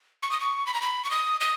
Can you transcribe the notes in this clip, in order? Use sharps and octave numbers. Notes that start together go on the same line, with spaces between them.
C#6
D#6
C#6
B5
A#5
B5
C#6
D#6
D#6